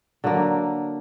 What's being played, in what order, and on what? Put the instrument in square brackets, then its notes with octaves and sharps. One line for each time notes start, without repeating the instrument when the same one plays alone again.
[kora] D3 F#3 A#3